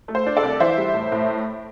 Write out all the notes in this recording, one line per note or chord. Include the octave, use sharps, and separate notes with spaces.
A3
C5
D4
A4 D5
C2
E3 C5 E5
G3
A2
A2